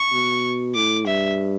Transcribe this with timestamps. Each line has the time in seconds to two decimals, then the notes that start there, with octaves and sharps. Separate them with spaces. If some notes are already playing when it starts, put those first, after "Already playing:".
Already playing: C#6
0.13 B2
0.75 A2 D6
1.07 G2 E5